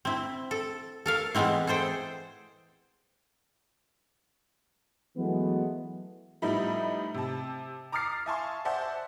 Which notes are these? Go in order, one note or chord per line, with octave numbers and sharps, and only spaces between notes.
C4 E4
A4
A4 A#4 F5
E3 G#3 B3 C4 E4
G#4 A4 C5 G5
E3 F#3 G#3 A3 B3
A2 F3 G3 B3 D#4 E4
C3 A5
A#5 D6 D#6 F6 A6 C7
E5 F5 G#5 A5 C6 C#6
C5 D5 E5 F#5 A5 C6